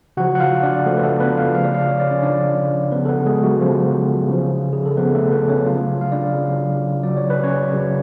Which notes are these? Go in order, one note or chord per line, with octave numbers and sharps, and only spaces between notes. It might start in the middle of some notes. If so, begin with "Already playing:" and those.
C#3 F3 F#4 F#5
F#5
F4 F5
D4 D5
C#3 F3 A3 A4
B4
A3 A4
B3 B4
F4 F5
C#3 F3 F5
D5
F4 F5
C#5
D5
C#4 C#5
C#3 F3 D4 D5
C#3 F3 B3 B4
A4
B3 B4
G#3 G#4
F#3 F#4
C#3 F3 F4
C#3 F3
G#4
A4
C#3 F3 B3 B4
A3 A4
B3 B4
C#4 C#5
C#3 F#3 F4 F5
F5
D4 D5
C#3 F#3
C#3 F#3 D5
C#5
B4
C#4 C#5
C#3 F#3